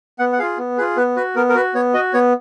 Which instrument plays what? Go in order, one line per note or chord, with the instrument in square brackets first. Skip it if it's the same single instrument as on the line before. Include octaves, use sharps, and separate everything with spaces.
[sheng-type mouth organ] B3 F#5
F#5
F4 G#4 F5
B3
F4 G#4 B4
B3 B4
F#4 B4
B3 A#4
A#4
F#4 B4
B3 C#5
F#4 D#5
B3 C#5